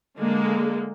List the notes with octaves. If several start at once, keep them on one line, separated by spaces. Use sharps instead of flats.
D3 G#3 A#3